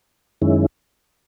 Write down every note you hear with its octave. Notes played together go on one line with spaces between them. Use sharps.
F#2 D#3 G#3 C#4 E4